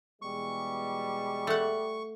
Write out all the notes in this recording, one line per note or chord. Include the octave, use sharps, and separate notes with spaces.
B2 E3 G3 G#3 C#6
A3 F#5